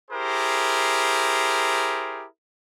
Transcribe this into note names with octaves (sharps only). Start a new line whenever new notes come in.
E4 G4 G#4 A#4 C5